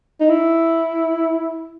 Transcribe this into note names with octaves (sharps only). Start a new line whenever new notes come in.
D#4
E4